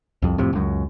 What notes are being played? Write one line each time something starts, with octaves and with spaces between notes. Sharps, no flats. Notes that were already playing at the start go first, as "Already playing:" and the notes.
C2 F2
F2 A2 C3
C#2 F#2